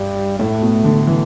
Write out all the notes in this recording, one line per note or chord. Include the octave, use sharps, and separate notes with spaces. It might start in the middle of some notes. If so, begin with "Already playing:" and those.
Already playing: G2 G3
A2 A3
B2
D3
E3